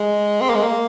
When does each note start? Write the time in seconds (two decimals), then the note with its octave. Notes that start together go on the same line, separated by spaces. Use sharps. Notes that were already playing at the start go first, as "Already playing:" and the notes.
Already playing: G#3
0.41 C4
0.49 A#3
0.56 G#3
0.63 A#3